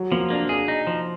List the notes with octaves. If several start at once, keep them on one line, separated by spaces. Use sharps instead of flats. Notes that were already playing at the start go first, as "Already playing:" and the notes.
Already playing: F#3
F3 A#3
A#3 D4
D4 G#4
D#4
F3